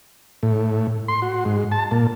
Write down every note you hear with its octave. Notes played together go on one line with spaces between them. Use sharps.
A2
C6
F#4
G#2
A5
A#2